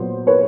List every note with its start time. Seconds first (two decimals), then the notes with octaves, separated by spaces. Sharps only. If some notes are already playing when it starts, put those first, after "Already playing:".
Already playing: A#2 F#3 B3 C5
0.27 B4 C#5